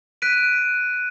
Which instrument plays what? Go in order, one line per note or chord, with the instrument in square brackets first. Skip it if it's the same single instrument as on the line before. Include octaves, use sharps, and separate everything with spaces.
[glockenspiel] F#6 B6 D7 D#7